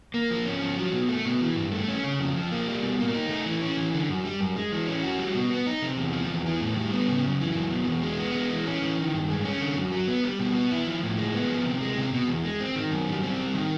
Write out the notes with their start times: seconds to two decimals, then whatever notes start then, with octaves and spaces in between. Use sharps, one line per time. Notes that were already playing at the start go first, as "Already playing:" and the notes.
0.14 A#3
0.31 F3
0.46 C#4
0.62 F3
0.77 F#3
0.93 B2
1.09 A3
1.25 B2
1.41 E3
1.56 G2
1.72 A3
1.88 C#4
2.04 C#3
2.20 F2
2.36 F3
2.51 A#3
2.67 G3
2.82 B2
2.99 A#3
3.14 D#4
3.29 A3
3.46 E3
3.62 C#4
3.77 E3
3.93 D3
4.09 F#2
4.25 G3
4.41 F#2
4.56 G#3
4.72 E3
4.88 C#4
5.03 F#4
5.18 G3
5.34 B2
5.50 B3
5.67 D#4
5.82 C3
5.98 E2
6.13 F3
6.29 E2
6.46 E3
6.61 A2
6.76 G3
6.93 B3
7.08 C#3
7.25 F#2
7.40 E3
7.55 F#2
7.71 B2
7.87 E2
8.03 G#3
8.19 B3
8.34 G#3
8.50 E3
8.66 C#4
8.82 E3
8.98 D#3
9.13 G2
9.29 G#3
9.45 C#4
9.61 D3
9.76 F#2
9.92 F#3
10.07 B3
10.24 G3
10.39 B2
10.55 B3
10.71 E4
10.87 F3
11.03 A2
11.18 G#3
11.34 B3
11.49 F3
11.66 C3
11.81 G#3
11.97 C3
12.13 B2
12.28 E2
12.45 G#3
12.61 C4
12.75 D#3
12.91 F#2
13.07 G3
13.23 C4
13.39 G3
13.54 D#3